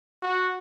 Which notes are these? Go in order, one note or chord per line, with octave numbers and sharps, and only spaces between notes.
F#4